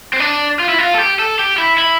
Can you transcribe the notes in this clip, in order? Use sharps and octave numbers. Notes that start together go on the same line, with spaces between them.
C4
D4
F4
E4
F4
A4
G4
A4
G4
E4
E4